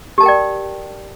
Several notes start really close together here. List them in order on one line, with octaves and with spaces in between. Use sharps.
G4 A5 A#4 G5 D5